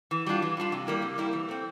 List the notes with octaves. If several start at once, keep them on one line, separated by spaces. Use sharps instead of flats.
E3
G3 D4 F4
E3
G3 D4 F4
C3
G3 A#3 E4
C3
G3 A#3 E4
E3
A3 C4